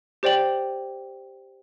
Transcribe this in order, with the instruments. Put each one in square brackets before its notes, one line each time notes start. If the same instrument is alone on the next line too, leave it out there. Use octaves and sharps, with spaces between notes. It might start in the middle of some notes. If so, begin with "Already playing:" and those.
[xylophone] G4 C5 D5 G5 F#7